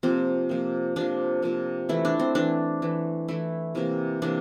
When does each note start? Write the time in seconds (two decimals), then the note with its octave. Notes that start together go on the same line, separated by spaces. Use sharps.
0.03 C3 F3 A#3 C4
0.49 C3 F3 A#3
0.96 C3 F3 A#3 D4
1.42 C3 F3 A#3
1.89 E3 A3 E4
2.05 D4
2.20 C4
2.35 E3 A3 D4
2.82 E3 A3
3.28 E3 A3 E4
3.75 C3 E3 A#3
4.22 C3 E3 A#3 D4